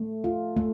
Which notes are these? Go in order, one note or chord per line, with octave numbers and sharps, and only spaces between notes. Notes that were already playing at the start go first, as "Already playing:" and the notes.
Already playing: A3
F4
A3